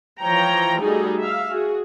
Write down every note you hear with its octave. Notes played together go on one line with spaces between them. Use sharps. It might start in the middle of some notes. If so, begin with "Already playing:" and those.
E3 F3 C#5 G5 A#5
G3 A3 D#4 F#4 G#4 A4
E5 F5
F#4 G#4